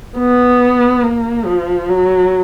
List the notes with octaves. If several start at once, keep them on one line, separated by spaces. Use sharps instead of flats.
B3
A#3
F3
F#3